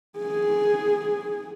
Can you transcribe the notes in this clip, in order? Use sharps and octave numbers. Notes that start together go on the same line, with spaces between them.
G#4